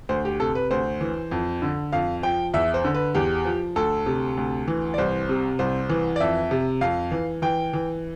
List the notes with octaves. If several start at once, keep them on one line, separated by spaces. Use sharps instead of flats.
D2 C5
G4
C3 A4
B4
D2 C5
E3
F2
D3
F2 F5
F3 G5
E2 E5
C5
D3
B4
E2 G4
F3
D2 A4
C3
D2
E3
D5
C2 C5
C3
C2 C5
E3
D5
F2 E5
C3
F2 F5
E3
E3 G5
E3